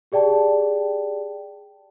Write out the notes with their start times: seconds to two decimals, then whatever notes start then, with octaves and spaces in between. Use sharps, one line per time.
0.12 G4 G#4 D5 G5 A5